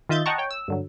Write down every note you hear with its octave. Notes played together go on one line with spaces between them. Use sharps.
D#3 F4 D#5 E5 G6 A6
D#5 F#5 G5 A5 A#5 C#6
C#5 G5
E6
G2 D3 F#3